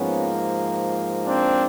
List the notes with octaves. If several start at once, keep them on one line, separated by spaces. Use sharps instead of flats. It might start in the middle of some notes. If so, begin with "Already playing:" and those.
Already playing: G#2 F3 A#3 B3 C#4
C4 D4